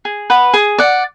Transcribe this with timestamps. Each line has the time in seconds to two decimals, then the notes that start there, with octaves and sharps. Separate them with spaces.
0.05 G#4
0.30 B4 F#5 B5
0.54 G#4
0.78 D5 F#5